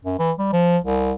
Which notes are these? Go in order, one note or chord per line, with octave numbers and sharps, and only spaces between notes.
F#2
E3
G3
F3
C2